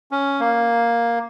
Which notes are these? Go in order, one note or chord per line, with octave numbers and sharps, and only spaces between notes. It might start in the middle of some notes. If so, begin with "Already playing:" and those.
C#4
A#3